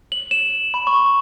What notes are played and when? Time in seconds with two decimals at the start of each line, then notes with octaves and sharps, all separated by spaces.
0.12 F#7
0.31 E7
0.74 B5
0.87 C#6